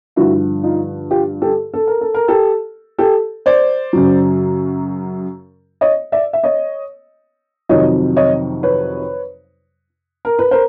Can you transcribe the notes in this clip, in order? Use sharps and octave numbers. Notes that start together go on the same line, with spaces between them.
G2 D3 F3 E4 F#4
D#4 F4
F4 G4
G4 A4
A4
A#4
A4
A#4
G4 A4
G4 A4
C5 D5
F#2 C#3 F#3
C#5 D#5
D5 E5
E5
C#5 D#5
F2 C3 D#3 F#3 C#5 D#5
C#5 D#5
B4 C#5
A#4
B4
A#4 C5